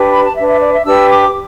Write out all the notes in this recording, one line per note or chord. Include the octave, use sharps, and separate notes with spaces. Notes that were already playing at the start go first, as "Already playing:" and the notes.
Already playing: D4 G4 B4
B5
A5
D4 B4 E5
E5
D5
E5
D4 G4 B4 E6
D6